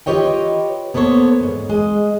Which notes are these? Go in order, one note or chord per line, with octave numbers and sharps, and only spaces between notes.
F4 G4 B4 C#5 D#5 G5
A#3 B3 A4 C5 C#5
F2 G#2
G#3 D#5